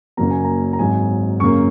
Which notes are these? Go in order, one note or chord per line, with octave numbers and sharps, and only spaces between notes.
F#1 F#2 F#3 A#3 A#5
G#5
A#5
A#5
G#1 G#2 F#3 G#5
F#2 C#3 A#3 C#6